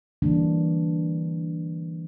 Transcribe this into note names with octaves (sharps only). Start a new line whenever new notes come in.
D3 E3 G3 A#3 D4